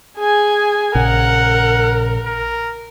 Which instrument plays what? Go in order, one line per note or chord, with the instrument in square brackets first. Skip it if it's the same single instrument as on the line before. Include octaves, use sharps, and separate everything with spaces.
[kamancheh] G#4 G#5
[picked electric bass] A#1 C#3 [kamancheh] A#4 [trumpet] F#5
[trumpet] A#4